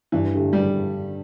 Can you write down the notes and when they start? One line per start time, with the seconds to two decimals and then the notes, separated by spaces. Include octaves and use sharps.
0.12 G2 E3
0.34 D3 A3 G4
0.53 G3